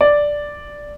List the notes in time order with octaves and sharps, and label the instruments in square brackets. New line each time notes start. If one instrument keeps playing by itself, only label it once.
[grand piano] D5